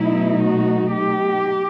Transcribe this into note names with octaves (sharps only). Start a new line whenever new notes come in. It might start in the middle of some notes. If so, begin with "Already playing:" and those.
Already playing: B2 F#3 A3 D#4 E4
F#4
G4